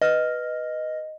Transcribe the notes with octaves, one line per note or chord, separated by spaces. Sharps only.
B4 D#5 F6